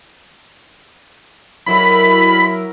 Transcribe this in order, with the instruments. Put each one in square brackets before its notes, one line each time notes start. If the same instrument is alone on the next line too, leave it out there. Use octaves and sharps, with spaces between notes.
[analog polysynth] F#3 E4 A#4 [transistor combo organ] B5